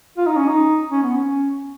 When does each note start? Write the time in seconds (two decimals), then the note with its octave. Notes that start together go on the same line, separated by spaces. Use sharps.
0.17 F4
0.27 D#4
0.36 C#4
0.47 D#4
0.91 C#4
1.03 B3
1.16 C#4